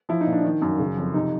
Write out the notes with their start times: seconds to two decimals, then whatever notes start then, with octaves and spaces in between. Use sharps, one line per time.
0.09 F3 E4
0.21 D#4
0.26 A#2
0.33 D4
0.44 D#3
0.62 F#2
0.79 C#3
0.97 F2
1.14 C3 D#4